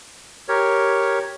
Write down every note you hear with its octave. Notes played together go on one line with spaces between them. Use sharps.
G4 A#4 C#5